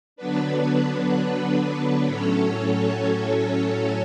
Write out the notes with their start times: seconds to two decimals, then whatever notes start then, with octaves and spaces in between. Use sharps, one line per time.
0.16 D3 F#3 B3 D4 B4
2.06 A2 F#3 C#4 A4 C#5